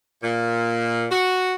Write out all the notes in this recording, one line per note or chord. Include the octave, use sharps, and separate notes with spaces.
A#2
F#4